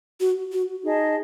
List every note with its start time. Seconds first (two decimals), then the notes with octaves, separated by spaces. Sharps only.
0.20 F#4
0.52 F#4
0.83 D#4 G#4 D#5 A5